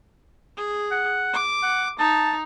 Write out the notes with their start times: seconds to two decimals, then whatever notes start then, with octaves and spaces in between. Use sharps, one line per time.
0.57 G#4
0.91 F#5
1.33 D6
1.63 F#5
1.99 D#4 A5